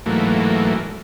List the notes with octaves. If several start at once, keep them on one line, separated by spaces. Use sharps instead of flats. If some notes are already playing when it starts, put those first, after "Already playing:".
G#2 E3 F#3 A3 A#3